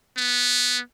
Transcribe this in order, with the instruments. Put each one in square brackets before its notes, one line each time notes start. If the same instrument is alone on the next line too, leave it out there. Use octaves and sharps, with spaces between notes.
[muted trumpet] B3